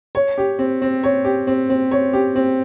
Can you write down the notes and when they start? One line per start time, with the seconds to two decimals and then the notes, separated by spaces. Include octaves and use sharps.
0.15 C#5
0.38 G4
0.59 C4
0.82 C4
1.04 C#5
1.25 G4
1.47 C4
1.70 C4
1.91 C#5
2.13 G4
2.36 C4